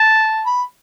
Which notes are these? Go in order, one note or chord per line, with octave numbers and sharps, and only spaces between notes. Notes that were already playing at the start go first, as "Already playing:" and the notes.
Already playing: A5
B5